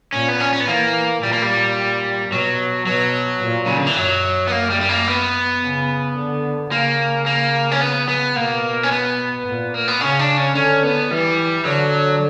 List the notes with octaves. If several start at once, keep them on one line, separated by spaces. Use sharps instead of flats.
A#2 C#4
B3
C#4
C#4
B3
E3 A#3
A#2 G3
A#3
G3
B2 F#3
B2 F#3
A#2
C#3
D3
E3
F#2 F#3
B3
A#3
G3
G3
A#3
B3
C#3
D3
C#3 A#3
A#3
C#4
B3
B3
B2 A#3
C#4
B3
A#2
A#3
B3
C#3 C#4
D4
C#4
D3 C#4
B3
E3 G3
D3 F#3